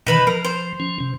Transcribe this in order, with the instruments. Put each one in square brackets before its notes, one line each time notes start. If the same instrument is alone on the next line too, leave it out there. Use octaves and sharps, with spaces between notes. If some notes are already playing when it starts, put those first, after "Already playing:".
[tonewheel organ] B2 D#3 E3 [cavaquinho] D#4 B4 B5
[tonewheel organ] F3 [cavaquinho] A#4
[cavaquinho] C5
[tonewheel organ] F3 C#4
C3